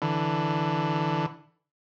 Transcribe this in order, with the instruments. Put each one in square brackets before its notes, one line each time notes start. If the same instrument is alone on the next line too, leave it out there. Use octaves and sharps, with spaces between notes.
[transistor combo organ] D3 E3